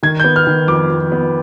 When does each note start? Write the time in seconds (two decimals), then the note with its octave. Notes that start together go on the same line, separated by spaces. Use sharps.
0.03 D#3 G#6
0.20 G6
0.24 B3
0.36 F6
0.47 D#3
0.68 F2 D6
0.90 F2
1.12 B3